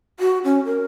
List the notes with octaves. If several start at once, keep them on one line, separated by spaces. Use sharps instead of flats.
F#4
C#4
A#4